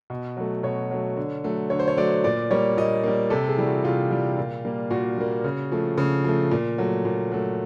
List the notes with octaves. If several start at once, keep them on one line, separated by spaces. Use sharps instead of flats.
B2
F#3 A3
B2 C#5
F#3 A3
D3
F#3 A3
D3 C#5
C5
C#5
F#3 A3 D5
A#2 D5
G3 A#3 C#5
A#2 D#5
G3 A#3
C3 A4
G#4
E3 G3
F#4
C3 F4
E3 G3
A#2
G3 A#3
A#2 F#4
G3 A#3
C#3
F3 A3
C#3
F3 A3
A#2
F#3 A3
A#2
F#3 A3